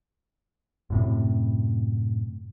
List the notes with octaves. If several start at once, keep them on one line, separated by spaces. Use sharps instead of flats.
F#2 A2 C3